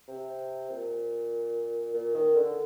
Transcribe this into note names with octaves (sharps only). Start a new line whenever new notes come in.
C3
A#2
A#2
D#3
D3